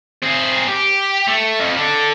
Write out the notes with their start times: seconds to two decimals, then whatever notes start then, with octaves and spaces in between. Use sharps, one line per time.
0.23 C4 G#4
0.69 G4
1.28 A3
1.59 F2
1.77 D3